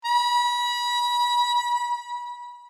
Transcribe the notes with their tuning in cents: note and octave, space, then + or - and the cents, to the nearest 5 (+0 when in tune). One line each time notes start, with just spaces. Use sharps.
B5 -30